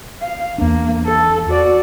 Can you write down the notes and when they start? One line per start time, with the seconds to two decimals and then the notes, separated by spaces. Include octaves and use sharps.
0.21 F5
0.58 E2 A#3 D4
1.06 A4
1.50 F#4 D5